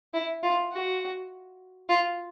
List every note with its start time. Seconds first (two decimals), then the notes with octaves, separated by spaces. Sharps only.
0.14 E4
0.43 F4
0.72 F#4
1.89 F4